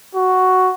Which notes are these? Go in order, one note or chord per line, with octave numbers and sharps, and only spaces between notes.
F#4